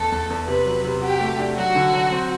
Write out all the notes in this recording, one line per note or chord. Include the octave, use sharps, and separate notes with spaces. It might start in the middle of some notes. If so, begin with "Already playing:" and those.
Already playing: E2 A4
E2
E2
C3 B4
F#3
C3
F#4 G4
A3
D4
F#3 F#4
D3
F#3
C4